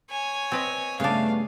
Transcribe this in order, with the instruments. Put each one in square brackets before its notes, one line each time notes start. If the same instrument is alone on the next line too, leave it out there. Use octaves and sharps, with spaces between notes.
[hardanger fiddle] C#5 G#5
[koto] C4 B4 D#5
[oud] G2 A3 B3 [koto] C#3 D4 [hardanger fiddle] F5